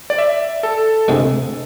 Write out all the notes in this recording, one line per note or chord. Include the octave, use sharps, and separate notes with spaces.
D5
E5
A4
D2 C3 G#3